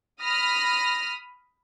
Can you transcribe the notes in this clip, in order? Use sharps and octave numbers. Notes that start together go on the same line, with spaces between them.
B5 D#6 F6 A#6